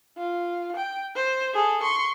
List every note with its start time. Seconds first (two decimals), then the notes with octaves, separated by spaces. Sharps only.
0.17 F4
0.76 G5
1.15 C5
1.54 G#4 A4
1.83 C6 C#6